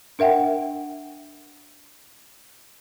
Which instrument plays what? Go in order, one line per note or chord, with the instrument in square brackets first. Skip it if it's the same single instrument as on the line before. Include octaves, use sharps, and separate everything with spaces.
[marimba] D4 A#4 E5 F#5 G5